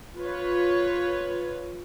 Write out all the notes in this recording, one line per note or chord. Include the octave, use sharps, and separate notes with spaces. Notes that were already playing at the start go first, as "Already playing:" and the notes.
F4 B4 C#5